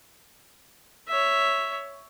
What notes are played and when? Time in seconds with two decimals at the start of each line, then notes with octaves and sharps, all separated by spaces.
1.08 C#5 E5